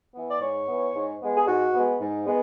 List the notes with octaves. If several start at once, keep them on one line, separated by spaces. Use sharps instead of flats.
E3 B3
D5
G#2 C#5
E3 B3
G#2
G#3 B3
G#4
G#2 F#4
G#3 B3
G#2
G#3 B3